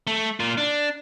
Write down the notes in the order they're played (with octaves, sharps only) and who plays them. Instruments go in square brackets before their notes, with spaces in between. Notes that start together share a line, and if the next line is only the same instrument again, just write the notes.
[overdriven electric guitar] A3
A#3 F4
D4